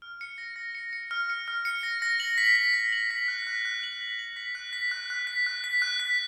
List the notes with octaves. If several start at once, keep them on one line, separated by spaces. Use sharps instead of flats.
F6
C#7
A#6
A#6
C#7
C#7
F6
C#7
F6
C#7
A#6
A#6
F#7
B6
B6
B6
F#7
B6
F#6
F#6
F#6
F#7
B6
F#7
B6
F#6
B6
F#6
F#6
B6
F#6
B6
F#6
B6